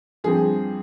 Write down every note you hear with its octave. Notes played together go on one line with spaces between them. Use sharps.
G2 F3 C4 G#4